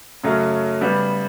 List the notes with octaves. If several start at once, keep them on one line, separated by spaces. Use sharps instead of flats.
F#2 C#3 F#3 A3 C#4
C#3 G3 B3